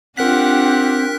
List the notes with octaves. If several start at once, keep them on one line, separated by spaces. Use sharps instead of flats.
C4 D4 F4 G4 A#4 F#5 F#6 B6